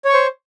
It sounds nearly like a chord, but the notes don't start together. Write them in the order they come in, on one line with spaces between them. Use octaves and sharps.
C#5 C#6 C5